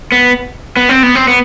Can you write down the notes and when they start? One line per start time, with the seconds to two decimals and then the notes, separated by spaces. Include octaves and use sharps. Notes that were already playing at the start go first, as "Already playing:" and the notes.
0.12 B3
0.77 B3
0.89 C4
1.03 B3
1.15 C4
1.28 B3